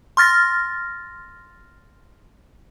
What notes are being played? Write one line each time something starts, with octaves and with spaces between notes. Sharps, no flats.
C6 F6 A6 A#6